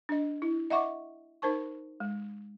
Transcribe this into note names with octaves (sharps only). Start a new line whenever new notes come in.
D4 D#5
E4
D#5 E5 F#5 C#6 D6
D#4 A#4 C5 A5 C#6
G#3